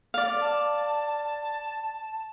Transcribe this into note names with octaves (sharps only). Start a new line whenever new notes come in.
D5 F5
A5